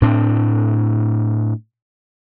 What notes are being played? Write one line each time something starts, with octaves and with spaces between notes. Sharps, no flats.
A2 C4 D4